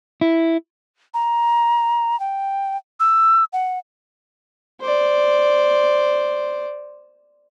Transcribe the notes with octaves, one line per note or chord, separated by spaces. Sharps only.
E4
A#5
G5
E6
F#5
C5 D5